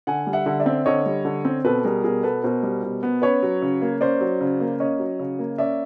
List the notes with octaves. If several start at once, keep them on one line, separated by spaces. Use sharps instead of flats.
D3 F#5 G#5
G3
E5 F#5
D3
D5 E5
C4
D3 C#5 D#5
G3
D3
C4
B2 A4 B4
G3 G#4 A#4
B2 G#4 A#4
B3 A4 B4
B2 A#4 C5
G3
B2
B3
C#4 B4 C#5
F#3
C#3
A#3
C#4 C5 D5
F#3
C#3
A#3
C#4 C#5 D#5
F#3
C#3
A#3
C#4 D5 E5